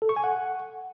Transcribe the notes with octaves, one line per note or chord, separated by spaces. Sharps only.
A4
C#6
G#5
F#5